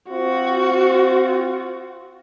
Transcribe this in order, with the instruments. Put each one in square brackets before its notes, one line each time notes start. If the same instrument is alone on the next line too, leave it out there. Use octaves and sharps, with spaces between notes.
[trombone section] C4 F4 [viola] F#4